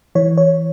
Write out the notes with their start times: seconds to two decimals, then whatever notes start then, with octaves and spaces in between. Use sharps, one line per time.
0.15 E3 C#5
0.37 C#5